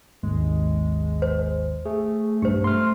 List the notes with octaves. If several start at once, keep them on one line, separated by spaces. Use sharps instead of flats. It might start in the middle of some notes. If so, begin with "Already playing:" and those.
G#1 D#2 G#3
C5
A3 G#4
B1 G2 G4 C5
A3 C6 F6